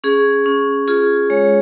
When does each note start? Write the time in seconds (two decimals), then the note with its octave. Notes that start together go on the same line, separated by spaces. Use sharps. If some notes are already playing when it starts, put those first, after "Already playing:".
0.04 C#4 G#4
0.46 C#4
0.88 F4 G#4
1.30 G#3 C#5